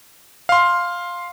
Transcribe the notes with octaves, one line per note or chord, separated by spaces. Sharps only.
F5 C6